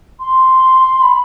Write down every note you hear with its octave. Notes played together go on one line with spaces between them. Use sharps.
C6
B5